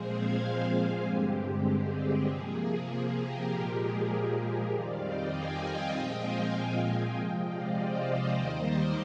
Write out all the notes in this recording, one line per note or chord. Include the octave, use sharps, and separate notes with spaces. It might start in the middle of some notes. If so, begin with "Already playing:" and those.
Already playing: A#2 F3 G#3 C4 G#4 C5
F5 G#5
G2 D3 G#3 C4 G4
G#4
G#4
C3 F3 A#3
G#4
G4 A#4
A#2 F3 G#3
G#4
F2 D#3 G3 C4 D5 F5
D#5 G5
F5 G#5
D#5 G5
A#2 F3 G#3 C4 D#5 G5
F5 G#5
D#5 G5
D#5 G5
C3 F3 G#3
D5 F5
C5 D#5
D5 F5
D#2 D#3 G3 A#3 C5 D#5
A#4 D5